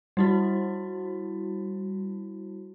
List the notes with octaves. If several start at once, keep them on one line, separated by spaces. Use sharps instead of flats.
G3 E4 F#4